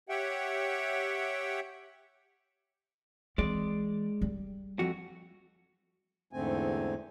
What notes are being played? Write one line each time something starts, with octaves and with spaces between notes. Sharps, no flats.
G4 C#5 E5 F#5 G5
E3 G#3 C4 D5
G3
F2 F#4
E2 G#2 D3 A3 C4 G#5